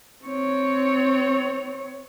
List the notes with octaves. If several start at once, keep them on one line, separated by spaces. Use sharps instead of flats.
C4 C#5